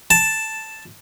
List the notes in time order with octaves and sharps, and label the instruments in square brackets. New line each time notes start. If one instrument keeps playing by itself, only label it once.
[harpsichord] A5